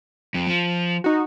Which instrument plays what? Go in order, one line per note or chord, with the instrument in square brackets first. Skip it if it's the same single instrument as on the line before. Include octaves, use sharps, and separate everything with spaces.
[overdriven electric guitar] F2
F3
[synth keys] D#4 F#4